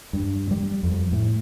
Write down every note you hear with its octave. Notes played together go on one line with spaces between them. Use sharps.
G2
G3
F2
A2